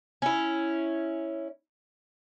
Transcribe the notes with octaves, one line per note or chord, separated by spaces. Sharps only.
C#4 E4